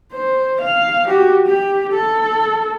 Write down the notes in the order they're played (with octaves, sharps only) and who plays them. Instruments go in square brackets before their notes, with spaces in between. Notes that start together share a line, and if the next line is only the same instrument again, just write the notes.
[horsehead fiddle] C5
F5
F#4 G4
G4
A4